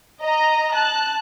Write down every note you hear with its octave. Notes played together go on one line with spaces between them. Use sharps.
D#5 A#5
A5 F#6